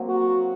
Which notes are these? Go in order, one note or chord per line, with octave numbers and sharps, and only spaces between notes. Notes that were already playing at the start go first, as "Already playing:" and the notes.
Already playing: F#3 A#3 C4
F#4